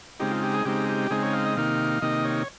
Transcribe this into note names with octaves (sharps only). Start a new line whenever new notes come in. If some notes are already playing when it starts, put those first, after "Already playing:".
C#3 G#3 C4 D#4 G4
F4
G4
G#4
C#3 G#3 C4 D#4 G4
G4
C#3 G#3 C4 D#4 G#4
C#5
F5
D#5
C3 D#3 A#3 D#4 F5
C3 D#3 A#3 D#4 D#5
C#5